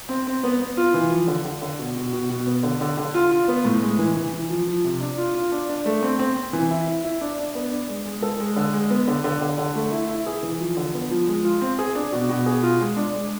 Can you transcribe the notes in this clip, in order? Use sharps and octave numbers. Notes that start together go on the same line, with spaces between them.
C4
C4
B3
B3
F4
E3
F3
D3
D3
D3
B2
B2
B2
B2
B3
D3
D3
D3
F4
F4
B3
A2
G#3
E3
E3
E3
F3
F3
C3
D4
F4
F4
D4
D4
A3
C4
C4
C4
E3
E4
E4
E4
D4
D4
B3
D4
G#3
G#3
A4
G#3
D3
G#3
B3
D3
D3
D3
D3
A3
E4
E4
G#4
E3
F3
D3
B3
F3
G#3
F4
C4
G#4
D4
B2
B2
G#4
F4
G#3
D4
G#3